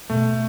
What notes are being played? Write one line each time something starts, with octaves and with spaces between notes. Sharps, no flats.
B2 A3